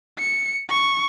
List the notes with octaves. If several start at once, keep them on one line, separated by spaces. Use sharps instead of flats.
C#7
C#6